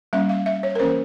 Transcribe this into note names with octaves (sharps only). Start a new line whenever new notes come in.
G3 A#3 C#4 E5
F5
E5
C#5
A#4
E3 A#3 C#4 C5